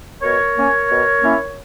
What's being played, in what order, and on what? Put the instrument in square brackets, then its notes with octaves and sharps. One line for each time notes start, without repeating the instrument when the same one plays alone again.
[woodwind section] B2 A#4 C#5
A#3 C#4
B2
A#3 C#4 E4